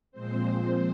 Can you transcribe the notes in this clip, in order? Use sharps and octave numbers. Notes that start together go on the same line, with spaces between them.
A#2 F3 G#3 C4 C5